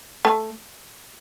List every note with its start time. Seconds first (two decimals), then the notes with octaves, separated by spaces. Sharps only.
0.25 A3